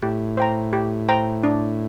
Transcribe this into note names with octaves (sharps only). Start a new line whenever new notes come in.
A2 G4
C5 G5 A#5
G4
C5 G5 A#5
D4